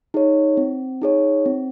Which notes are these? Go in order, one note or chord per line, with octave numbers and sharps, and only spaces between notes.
D#4 G#4 C#5
C4
D#4 G#4 C#5
C4